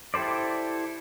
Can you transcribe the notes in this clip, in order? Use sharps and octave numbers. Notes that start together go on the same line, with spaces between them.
E4 G4 A4 C5 D5